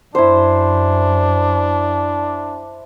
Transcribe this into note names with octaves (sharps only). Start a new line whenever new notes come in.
F#2 D4 E4 C5